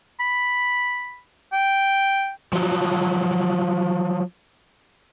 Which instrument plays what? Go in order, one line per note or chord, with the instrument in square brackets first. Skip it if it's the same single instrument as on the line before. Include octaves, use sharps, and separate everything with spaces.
[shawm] B5
G5
[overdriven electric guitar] F3 F#3